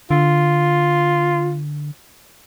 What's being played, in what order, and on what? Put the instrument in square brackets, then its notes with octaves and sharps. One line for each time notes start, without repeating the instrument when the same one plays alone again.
[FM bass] D3 [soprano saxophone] F4